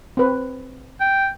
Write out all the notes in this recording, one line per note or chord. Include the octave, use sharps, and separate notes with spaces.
C4 B4
G5